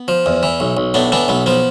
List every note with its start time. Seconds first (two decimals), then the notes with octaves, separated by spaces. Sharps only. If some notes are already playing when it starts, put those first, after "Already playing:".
Already playing: B3
0.08 F3
0.26 E2
0.43 E3
0.60 B1
0.77 B1
0.94 A2 B3 D4
1.12 E3 B3 D4
1.28 B1 B3
1.46 F3 B3